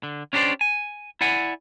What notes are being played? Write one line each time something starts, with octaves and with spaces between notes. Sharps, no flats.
D3
C#4 D4 G4 G#4 C5 D5
G#5
E4 D5 F#5 G#5